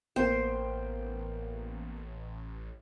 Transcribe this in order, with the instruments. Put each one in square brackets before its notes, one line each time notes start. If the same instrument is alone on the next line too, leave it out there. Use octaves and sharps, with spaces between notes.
[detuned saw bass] A1 [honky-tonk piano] A#3 B3 G5 [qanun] C5